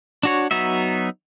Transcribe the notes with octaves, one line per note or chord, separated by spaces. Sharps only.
D4 F#4 C#5
F#3 B3 D#4 F#4 E5